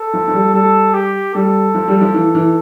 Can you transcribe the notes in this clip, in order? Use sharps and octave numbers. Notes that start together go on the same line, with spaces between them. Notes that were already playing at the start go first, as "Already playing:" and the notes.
Already playing: A4
F3
F3
G3
G3 A4
G4
G3 A4
F3
G3
F3
E3
E3